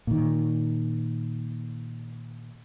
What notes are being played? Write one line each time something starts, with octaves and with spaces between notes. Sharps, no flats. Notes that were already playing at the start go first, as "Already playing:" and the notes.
A#2 D#3